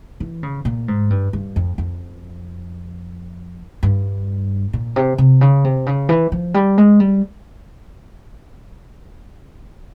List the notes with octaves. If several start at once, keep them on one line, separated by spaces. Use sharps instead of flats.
E3
C#3
A#2
G#2
G2
G2
F2
F2
G2
A#2
C3
C3
C#3
C3
C#3
E3
F3
G3
G#3
G3